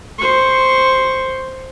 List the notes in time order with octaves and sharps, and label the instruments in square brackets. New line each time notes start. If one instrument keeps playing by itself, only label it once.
[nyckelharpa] C5 C#6